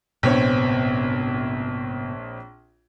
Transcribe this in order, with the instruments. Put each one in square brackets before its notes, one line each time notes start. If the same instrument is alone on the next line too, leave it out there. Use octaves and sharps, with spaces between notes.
[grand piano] A#1 C4 C#5 [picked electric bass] G#2 C3 B3